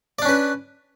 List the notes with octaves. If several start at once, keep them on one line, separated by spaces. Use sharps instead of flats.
C#4 D4 B4 D5